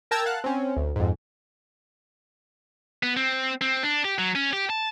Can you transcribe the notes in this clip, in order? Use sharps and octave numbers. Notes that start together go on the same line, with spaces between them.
A#4 G5 A5 A#5 E6 G#6
F5 F#5 A5 F#6
C4 C#4
D2
F2 G#2
B3
C4
C4
D4
G4
F#3
C#4
G4
A5